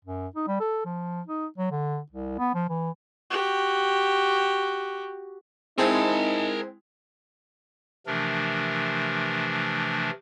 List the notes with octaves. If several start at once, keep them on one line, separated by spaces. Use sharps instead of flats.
F#2
D#4
G3
A4
F3
D#4
F#3
D3
C2
B3
F3
E3
F#4 G4
G#3 C4 D#4 E4 G#4 A#4 A5
C3 E3 F3 A3 D4 A#4